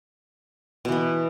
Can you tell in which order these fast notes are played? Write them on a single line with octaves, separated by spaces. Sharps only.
B2 E3 B3